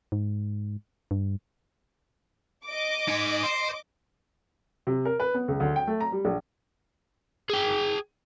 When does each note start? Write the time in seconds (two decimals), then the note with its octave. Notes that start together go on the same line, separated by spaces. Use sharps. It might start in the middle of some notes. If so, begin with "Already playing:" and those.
0.12 G#2
1.11 G2
2.66 D#5 D6
3.08 D#4 G#5
3.43 C5
4.87 C3
5.05 A#4
5.20 B4
5.34 B3
5.48 C#2
5.60 D2
5.76 G5
5.87 A3
6.00 A#5
6.12 G3
6.25 A#1
7.50 G#4 G5